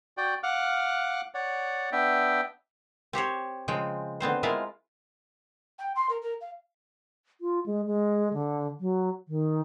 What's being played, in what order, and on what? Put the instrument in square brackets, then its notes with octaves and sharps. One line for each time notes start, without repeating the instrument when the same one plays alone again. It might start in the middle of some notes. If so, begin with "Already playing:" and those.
[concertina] F#4 D5 G5
F5 F#5 D6 F6 F#6
C#5 D5 F#5
B3 D4 E5 G5
[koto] C4 G4 C5 C#5
C#3 F3 G#3 C4 G5
D3 B3 C4 C5
G#3 E4 F4 A#4 E5 F5
[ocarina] G5
C6
A#4
A#4
F5
[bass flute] F4
G#3
G#3
D3
F#3
D#3